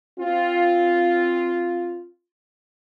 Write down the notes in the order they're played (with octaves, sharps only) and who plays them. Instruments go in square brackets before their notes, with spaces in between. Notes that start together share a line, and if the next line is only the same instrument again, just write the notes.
[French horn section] C4 F4